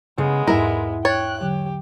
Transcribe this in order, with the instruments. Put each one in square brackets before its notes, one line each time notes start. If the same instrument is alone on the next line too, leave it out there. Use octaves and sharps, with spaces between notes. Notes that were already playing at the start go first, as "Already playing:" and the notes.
[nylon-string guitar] C#3 [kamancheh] G#3 B3
[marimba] E2 G#2 [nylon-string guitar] E4 E5 [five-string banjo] A#4
[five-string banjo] C#5 [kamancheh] G5 F#6 [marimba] A6
[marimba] D3 F#3 [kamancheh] G4